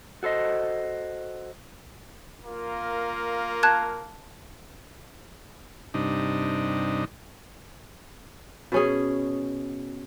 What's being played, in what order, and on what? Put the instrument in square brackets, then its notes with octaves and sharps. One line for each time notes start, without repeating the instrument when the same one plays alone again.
[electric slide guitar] F#4 A4 C5 D#5
[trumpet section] A#3 F4 A#4
[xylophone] A5 F#6 G#6
[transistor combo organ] G2 C3 D4 D#4
[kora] B2 C#4 G#4